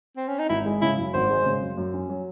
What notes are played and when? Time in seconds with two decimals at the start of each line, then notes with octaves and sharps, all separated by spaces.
0.17 C4
0.28 C#4
0.39 D#4
0.49 G#1 E4
0.65 G#3
0.82 C#3 E4
0.98 F#2
1.14 G#1 C5
1.30 G#3
1.46 C#3
1.62 F#2
1.77 F#2
1.94 C#4
2.09 F#3